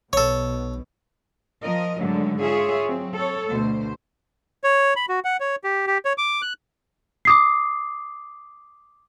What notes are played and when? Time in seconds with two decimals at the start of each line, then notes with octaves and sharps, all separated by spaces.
0.13 B1 B2 A4 C#5
1.61 F3 A#4 D#5
1.99 G#2 D3 D#3 F#3 G#3 A3
2.40 F4 G#4 C#5 E5
2.85 F#3 C4
3.13 A4 C#5
3.49 D2 B2 C5
4.64 C#5
4.96 B5
5.09 F#4
5.25 F#5
5.40 C#5
5.64 G4
5.87 G4
6.05 C#5
6.18 D6
6.42 F#6
7.25 D6 D#6 C7